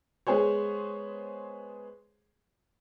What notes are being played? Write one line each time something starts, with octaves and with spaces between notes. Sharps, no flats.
G#3 B3 G#4 C5 C#5